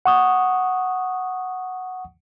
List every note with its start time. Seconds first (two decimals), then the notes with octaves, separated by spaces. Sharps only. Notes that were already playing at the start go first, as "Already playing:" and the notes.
0.06 F#5 C#6 D#6